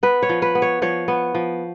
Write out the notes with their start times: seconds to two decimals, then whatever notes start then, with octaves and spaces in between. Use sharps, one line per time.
0.03 B3 B4
0.23 C#5
0.29 F3
0.42 B4
0.55 B3
0.62 C#5
0.82 F3 C#5
1.08 B3
1.35 F3